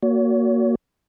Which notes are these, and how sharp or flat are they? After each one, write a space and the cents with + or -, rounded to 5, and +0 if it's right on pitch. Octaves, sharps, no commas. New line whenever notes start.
A#3 +0 F#4 +0 C#5 +40